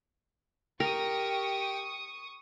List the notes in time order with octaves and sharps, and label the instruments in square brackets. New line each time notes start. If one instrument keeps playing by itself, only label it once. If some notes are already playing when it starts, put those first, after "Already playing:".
[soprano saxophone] G4 [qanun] A#4 [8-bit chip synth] G5 [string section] C#6 D#6